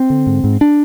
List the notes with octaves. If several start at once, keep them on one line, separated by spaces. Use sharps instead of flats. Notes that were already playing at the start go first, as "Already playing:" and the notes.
Already playing: C4
D3
G#2
G#2
D4